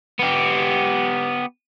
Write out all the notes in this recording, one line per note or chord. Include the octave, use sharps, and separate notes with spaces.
B3 G4